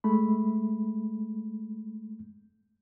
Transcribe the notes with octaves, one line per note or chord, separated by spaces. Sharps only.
G#3 A3 B5